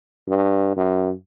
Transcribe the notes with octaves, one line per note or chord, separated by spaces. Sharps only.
G2
F#2